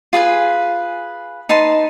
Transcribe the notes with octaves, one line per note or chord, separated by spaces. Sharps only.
F4 G#4 B4 G#5
D#4 B4 A5 C6